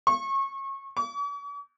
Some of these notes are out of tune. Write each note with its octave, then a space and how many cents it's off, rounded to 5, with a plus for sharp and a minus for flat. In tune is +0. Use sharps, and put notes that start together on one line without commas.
C#6 -30
C#6 +45